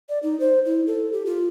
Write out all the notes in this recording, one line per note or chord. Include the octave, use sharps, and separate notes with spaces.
D5
D#4
C5
E4
A4
G4
F4